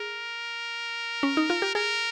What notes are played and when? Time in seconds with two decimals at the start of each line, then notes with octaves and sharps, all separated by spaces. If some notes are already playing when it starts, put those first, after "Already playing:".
Already playing: G#4 A#4
1.23 C#4
1.37 D#4
1.50 F4
1.62 G4
1.75 G#4 A#4